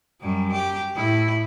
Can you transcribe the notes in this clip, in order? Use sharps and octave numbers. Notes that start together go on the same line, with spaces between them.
F#2 G3
G4
A2 E4